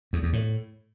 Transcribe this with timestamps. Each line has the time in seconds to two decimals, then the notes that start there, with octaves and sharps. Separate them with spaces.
0.13 E2
0.23 E2
0.33 A2